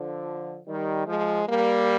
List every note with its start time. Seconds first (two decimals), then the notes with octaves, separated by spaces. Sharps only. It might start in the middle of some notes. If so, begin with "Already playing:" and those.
Already playing: D3 F3
0.67 D#3 G3
1.07 F3 G#3
1.47 G3 A#3